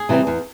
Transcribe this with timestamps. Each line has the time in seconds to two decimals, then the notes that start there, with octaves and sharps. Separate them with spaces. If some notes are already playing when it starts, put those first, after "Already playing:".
Already playing: G#4
0.09 C3 E3 G3
0.27 E2